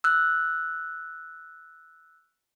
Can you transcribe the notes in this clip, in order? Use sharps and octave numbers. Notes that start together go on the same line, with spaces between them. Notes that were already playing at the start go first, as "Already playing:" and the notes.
E6 F#6